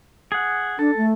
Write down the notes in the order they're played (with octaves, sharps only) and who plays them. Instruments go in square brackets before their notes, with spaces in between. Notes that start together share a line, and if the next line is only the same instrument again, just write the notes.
[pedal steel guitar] G#4 F#5
[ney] D4 [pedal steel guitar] A4
[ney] A3